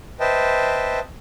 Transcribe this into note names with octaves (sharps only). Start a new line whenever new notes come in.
B4 C5 D#5 E5 G5 A5